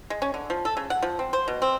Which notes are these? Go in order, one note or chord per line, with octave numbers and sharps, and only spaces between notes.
G#3
C#4
D3
F3
A4
C#3
F#5
F3
C4
C5
B2
C4